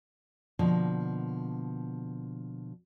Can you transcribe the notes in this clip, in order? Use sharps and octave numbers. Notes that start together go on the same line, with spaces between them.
B2 D3 F3 A#3